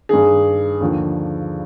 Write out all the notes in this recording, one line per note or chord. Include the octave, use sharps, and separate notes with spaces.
G2 D#3 G#4
D#2 D3 F3